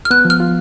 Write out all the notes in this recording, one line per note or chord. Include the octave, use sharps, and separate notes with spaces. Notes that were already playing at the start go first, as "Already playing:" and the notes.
F6
B3 F#6
F3
F6
F4